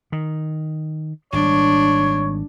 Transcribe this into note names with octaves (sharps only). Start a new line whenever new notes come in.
D#3
G#1 G3 D4 C#5